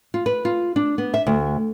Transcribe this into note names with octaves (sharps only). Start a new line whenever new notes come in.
F4
B4
F4
D4
B3
E5
D2